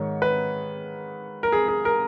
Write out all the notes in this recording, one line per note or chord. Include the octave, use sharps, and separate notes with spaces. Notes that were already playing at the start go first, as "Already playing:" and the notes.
Already playing: G#2 D#3 C#5
B4
A#4
G#4
G#4
A#4